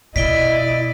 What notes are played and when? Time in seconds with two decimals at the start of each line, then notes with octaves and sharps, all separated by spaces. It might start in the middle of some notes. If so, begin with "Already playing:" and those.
0.16 B2 E4 D5 D#5 B6 D7 G7